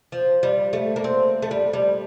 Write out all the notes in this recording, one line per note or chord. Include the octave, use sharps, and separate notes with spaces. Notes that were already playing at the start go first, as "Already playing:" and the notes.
F3
G3
A3
A#3
C4
A3
G3
G3